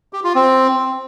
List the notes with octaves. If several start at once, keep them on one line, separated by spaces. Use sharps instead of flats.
G4
F4
C4